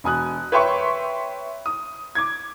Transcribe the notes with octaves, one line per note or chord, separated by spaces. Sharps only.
E1 G#5 D#6 F#6
B4 C#5 E5 G5 C6 C#6
D#6
D6 G#6